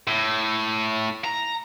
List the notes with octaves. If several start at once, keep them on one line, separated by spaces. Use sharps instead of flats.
A2
A#5